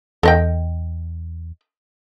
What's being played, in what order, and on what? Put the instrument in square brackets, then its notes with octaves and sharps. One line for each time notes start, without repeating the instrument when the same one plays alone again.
[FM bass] E2 [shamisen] A4 D#5 G5